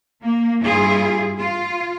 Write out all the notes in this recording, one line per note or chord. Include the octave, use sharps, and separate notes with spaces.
A#3
G2 G3 E4 F4 G#4
F4